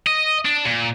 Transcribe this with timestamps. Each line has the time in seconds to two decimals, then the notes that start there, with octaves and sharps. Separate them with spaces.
0.07 D#5
0.46 D4
0.66 A#2